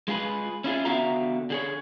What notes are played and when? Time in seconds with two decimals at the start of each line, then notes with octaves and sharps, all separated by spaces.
0.08 G#3 F4 G#4 B4
0.64 C#4 E4 F4 G#4
0.85 D3 B3 F#4 E5 F5 A#5
1.50 D3 G#4 C#5